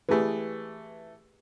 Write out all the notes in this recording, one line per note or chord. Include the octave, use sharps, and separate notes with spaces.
E3 A3 G4 G#4 B4